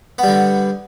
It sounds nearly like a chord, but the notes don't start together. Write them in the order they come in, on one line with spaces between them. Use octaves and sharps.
B3 G3 D3